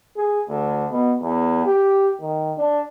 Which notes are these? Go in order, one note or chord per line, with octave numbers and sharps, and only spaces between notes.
G#4
D2
B2
E2
G4
D#3
D4